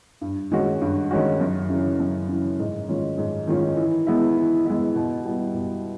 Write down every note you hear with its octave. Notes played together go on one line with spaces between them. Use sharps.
G2
D#3 G#3 C#4 F#4
G2
D#3 G#3 C#4 F#4
F#2
C#3 E3
F#2
C#3 E3
G#2
D#3 G#3 C#4 F4
G#2
D#3 G#3 C#4 F4
E3
G#3 B3 E4
E3
G#3 B3 E4
B2
G3 B3 E4
B2